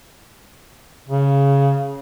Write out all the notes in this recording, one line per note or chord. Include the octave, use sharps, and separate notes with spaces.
C#3